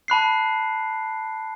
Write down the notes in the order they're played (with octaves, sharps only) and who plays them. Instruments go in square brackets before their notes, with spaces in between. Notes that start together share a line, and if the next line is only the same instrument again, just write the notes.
[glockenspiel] A5 B5 F#6 C7